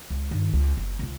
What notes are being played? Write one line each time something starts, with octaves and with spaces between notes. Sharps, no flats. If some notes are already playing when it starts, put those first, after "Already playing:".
C#2
G2 D#3
C#2
F#1
C#2 C#3